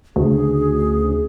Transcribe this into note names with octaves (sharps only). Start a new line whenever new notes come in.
D2 C#3 G#4